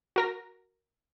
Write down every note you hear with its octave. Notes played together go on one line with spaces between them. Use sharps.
F#4 A#4 A#6